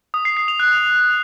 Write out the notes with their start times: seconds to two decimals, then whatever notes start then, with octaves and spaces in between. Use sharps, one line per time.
0.14 D#6
0.25 C7
0.37 C7
0.48 F7
0.60 F#6